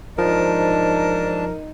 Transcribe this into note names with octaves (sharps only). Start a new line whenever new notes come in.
G#2 F3 D4 D#4 A#4 A5